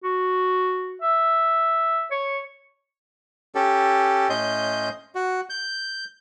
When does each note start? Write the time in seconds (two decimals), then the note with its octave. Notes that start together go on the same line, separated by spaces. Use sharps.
0.04 F#4
1.02 E5
2.11 C#5
3.55 C#4 G4 A4
4.30 A2 C#4 D#5 C6 G6
5.15 F#4
5.50 G6